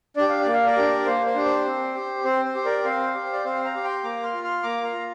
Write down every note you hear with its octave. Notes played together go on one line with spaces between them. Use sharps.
D4 G4 D5
F5
A#3 D5
F5
A#4 D5
D4 G4
A#3 C5
C5
D4 G4
C5
C4
G4
C4 C5
C5
G4
A#4 D5
C4 C5 F5
G4
D5
C4 C5 F5
F5 A#5
G4
G5 C6
A#3 A#5 D6
C6 F6
F4
C6 F6
A#3 A#5 D6
F5 A#5
F4